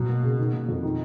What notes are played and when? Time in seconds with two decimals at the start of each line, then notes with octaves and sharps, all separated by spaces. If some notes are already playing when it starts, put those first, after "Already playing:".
Already playing: B2 F#3
0.08 A#3
0.23 C#3
0.38 D#3
0.53 A#3
0.68 F2
0.83 D#3